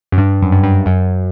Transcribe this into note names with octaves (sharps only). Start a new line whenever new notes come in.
F#2
G2
F#2
G2
G2
G2
F#2